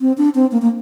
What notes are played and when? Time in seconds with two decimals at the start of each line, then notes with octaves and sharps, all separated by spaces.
0.01 C4
0.18 D4
0.35 C4
0.52 A#3
0.62 A#3